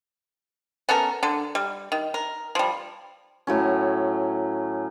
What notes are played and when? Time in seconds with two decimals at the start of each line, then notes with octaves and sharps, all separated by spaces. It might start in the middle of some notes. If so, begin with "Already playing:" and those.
0.89 B3 C#4 A4 A#4
1.23 D3 A4
1.55 G3
1.92 D#3
2.14 A#4
2.55 F3 G3
3.47 A2 F#3 C#4